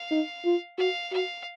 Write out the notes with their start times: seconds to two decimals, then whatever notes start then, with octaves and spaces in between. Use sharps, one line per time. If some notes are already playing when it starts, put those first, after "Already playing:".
Already playing: F5
0.11 D#4
0.45 F4
0.78 F#4 F5
1.12 F#4 F5